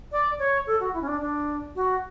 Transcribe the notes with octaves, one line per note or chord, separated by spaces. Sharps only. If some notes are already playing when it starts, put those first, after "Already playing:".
D5
C#5
A4
F#4
E4
C#4
D4
D4
F#4